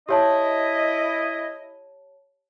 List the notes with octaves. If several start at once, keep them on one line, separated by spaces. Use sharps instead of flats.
E4 G4 C#5 D#5 A5